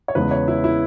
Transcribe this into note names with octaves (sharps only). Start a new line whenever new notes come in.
C#5
E2 C#3 G#3 B3 B4
C#5
E4
E4